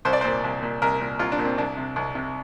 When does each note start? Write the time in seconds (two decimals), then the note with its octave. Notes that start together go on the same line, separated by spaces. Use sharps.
0.05 C2 C5
0.13 D5
0.21 A#2 C5
0.44 C2
0.63 A#2
0.82 C2 A#4
1.01 A#2
1.19 C2 F4
1.32 D4
1.39 A#2
1.45 C4
1.58 C2 D4
1.77 C3
1.96 C2
2.15 C3